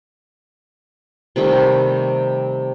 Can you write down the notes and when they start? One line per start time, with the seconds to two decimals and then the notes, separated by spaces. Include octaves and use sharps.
1.36 C3 D#3 G3 A3